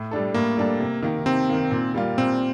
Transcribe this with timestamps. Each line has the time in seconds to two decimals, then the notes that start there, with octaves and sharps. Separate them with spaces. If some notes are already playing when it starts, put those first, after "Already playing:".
Already playing: A2
0.11 G3 D4 A4
0.34 A2 A#3
0.57 G3 D4 A4
0.80 C3
1.03 D#3 A#3
1.26 C3 C4
1.49 D#3 A#3
1.71 A#2
1.94 G3 A#3 F4
2.18 A#2 C4